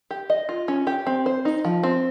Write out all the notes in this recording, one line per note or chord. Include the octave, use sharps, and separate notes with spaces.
G4
D#5
F4
C#4
G4
C4
C5
D#4
F3
C4